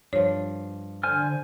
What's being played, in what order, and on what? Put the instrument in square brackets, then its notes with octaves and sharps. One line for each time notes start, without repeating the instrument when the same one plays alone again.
[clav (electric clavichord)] G2 F3 [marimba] C#5
[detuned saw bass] D3 [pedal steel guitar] C5 G#5 F6